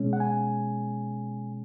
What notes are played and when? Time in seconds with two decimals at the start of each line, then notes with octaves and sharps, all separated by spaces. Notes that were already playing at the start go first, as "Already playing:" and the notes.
Already playing: B2 G#3 C#4
0.13 F#5
0.20 G#5